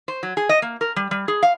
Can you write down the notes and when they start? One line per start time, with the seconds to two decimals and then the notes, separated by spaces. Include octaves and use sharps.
0.08 C5
0.23 F#3
0.37 G#4
0.49 D#5
0.62 A#3
0.81 A#4
0.96 G3
1.11 G3
1.28 G#4
1.43 F5